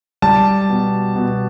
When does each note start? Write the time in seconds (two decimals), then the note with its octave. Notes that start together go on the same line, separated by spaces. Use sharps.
0.22 G3 A5
0.70 B2
1.16 B2